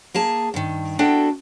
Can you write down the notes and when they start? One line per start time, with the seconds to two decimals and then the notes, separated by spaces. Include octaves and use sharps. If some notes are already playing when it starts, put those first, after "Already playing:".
0.14 A#3 G#4 A5
0.54 G2 D#3
0.99 B3 D4 E4 F#4 A4 G5